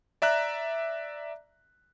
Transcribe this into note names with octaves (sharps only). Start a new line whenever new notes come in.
D5 E5 A#5 F#6